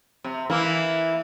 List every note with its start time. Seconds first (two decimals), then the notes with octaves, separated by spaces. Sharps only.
0.24 C3
0.50 E3 A#3 E4